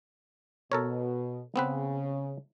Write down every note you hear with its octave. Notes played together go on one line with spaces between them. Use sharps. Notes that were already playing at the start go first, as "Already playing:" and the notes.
B2 A4 A#4 C#5
C#3 B3 C4 B4